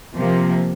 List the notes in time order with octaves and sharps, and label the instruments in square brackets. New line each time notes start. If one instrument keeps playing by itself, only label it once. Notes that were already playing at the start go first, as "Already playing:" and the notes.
[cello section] C3 F3 A#3